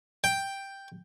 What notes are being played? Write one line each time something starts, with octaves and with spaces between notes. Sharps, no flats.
G5